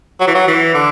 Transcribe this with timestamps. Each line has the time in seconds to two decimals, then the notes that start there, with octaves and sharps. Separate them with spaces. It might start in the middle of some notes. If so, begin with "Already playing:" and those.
0.20 F#3
0.27 E3
0.34 F#3
0.47 E3
0.74 D3